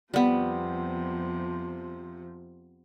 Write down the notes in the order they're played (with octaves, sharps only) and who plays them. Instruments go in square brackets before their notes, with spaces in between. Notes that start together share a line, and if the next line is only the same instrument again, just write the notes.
[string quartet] F2 C3 F3 [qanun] G3 B3